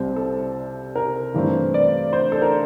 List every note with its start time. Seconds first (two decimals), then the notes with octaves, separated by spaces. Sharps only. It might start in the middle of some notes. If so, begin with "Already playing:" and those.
Already playing: C2 C3 G3 C4
0.16 A4
0.96 A#4
1.34 G2 E3 A3 C4
1.74 D5
2.13 C5
2.32 A4
2.42 A#4